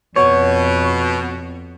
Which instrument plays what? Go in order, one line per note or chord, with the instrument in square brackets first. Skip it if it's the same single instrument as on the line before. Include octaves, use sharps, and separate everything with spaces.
[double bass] F2 [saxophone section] B2 [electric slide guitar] C#5